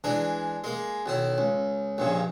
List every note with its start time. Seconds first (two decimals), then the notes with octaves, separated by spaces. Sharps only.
0.04 E3 G#3 D4
0.64 G#3 A#3
1.06 B1 D#3 E4
1.38 C#2
1.98 A#1 G2 C#3